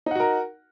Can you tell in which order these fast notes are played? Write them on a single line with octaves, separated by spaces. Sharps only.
D#4 F#5 F#4 A#4